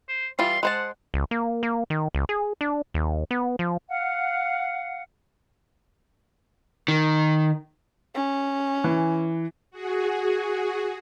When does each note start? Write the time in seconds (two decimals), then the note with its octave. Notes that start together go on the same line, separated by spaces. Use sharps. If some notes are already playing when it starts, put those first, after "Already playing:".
0.09 C5
0.39 E3 G3 F4 C6
0.63 G#3 C5 F#5 A5
1.14 C#2
1.31 A#3
1.63 A#3
1.90 D#3
2.15 C#2
2.29 G#4
2.61 D4
2.94 D#2
3.31 B3
3.59 F3
3.88 F5 F#5
6.88 D#3
8.15 C#4
8.84 E3
9.71 F#4 G#4